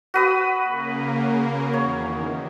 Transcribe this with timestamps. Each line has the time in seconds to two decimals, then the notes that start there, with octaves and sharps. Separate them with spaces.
0.14 F#4 B4 D#6
0.64 C#3 A#3
1.73 E2 D#3 C#5